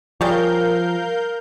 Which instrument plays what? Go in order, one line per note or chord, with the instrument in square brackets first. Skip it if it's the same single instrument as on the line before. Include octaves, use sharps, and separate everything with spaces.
[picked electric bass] F3 [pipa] G3 G#4 C#5 [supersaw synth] A#4 F5 G6